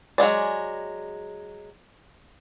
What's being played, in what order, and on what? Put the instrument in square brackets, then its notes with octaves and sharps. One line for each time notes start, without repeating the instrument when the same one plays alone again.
[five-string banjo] F#3 G#3 G#4 D5